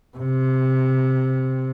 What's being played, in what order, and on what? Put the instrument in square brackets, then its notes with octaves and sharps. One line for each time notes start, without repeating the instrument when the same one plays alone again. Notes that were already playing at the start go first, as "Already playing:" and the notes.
[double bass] C3